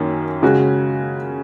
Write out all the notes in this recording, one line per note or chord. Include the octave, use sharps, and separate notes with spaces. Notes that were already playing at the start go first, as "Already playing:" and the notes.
Already playing: F#2 D#3 A#3 C#4
C#3 G#3 C#4 F#4